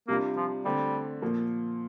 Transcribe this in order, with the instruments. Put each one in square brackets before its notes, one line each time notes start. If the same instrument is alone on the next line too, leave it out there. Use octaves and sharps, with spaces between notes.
[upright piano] C3 G3 D4 F4 [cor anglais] A#3
[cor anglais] F3
[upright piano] D3 A3 C4 [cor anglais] G3
[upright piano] A#2 F3 A#3